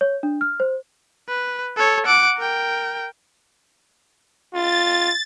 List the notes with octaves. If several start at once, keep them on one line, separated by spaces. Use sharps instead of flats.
C#5
D4
F6
C5
B4
A4 C#5
F#5 D6
A#4 G5
F4 A6